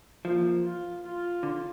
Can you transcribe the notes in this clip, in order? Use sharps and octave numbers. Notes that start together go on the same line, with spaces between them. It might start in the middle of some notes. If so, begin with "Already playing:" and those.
F3 A#3
F4
F4
D3